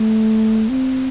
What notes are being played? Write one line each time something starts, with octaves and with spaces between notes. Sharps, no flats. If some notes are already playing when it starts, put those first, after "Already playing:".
Already playing: A3
C4